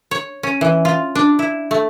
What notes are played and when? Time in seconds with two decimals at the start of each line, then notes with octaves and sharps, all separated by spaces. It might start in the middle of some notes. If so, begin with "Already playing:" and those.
0.11 C#5
0.43 C#4
0.61 E3
0.85 F4
1.15 D4
1.39 E4
1.71 A3